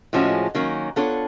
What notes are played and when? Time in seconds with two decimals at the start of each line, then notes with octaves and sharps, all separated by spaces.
0.13 A2 F3 G#3 C#4 F#4
0.55 D#3 F#3 A#3 C#4
0.96 B3 D4 F4 A4 C#5